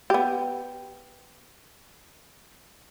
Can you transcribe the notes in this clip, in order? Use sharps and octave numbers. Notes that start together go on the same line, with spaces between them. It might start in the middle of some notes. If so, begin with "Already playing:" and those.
B3 G4